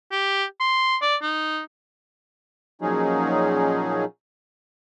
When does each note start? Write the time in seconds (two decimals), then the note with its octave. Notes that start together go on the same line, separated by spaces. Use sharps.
0.12 G4
0.60 C6
1.02 D5
1.22 D#4
2.82 A#2 F3 F#3 C#4 D#4 G#4